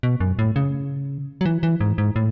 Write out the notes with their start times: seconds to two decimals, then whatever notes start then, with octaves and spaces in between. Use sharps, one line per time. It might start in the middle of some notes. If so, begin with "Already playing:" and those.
0.03 B2
0.20 F#2
0.39 A2
0.56 C#3
1.41 F#3
1.46 E3
1.63 E3
1.81 G#2
1.98 G#2
2.16 A2